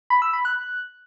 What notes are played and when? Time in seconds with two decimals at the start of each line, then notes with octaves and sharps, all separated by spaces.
0.10 B5
0.22 E6
0.33 B5
0.45 F#6